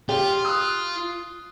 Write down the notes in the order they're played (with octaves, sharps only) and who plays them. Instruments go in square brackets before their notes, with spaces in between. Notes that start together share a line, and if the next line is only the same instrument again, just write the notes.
[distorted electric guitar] F4 [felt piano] G4
[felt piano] D#6 F#6